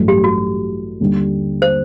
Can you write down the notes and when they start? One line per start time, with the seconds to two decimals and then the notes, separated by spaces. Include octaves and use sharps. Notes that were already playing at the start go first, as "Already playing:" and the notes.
Already playing: A1 G2 F#3 A3
0.08 G4
0.24 F#4
1.00 D#2 D3 G3
1.62 C5